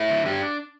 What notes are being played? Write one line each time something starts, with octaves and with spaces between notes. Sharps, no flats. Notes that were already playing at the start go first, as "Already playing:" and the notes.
Already playing: A3 E4
D3
D4 G4